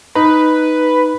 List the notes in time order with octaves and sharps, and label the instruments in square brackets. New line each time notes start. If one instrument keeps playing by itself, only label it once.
[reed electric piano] D#4 A#5 [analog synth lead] B4